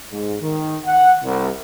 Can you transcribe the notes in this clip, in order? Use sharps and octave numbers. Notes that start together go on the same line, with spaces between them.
G#2
D#3
F#5
C2